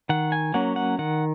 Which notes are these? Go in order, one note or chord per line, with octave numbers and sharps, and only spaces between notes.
D#3 F#5
G#5
F#3 A#3 C#4 F#5
F#5
D#3 F#5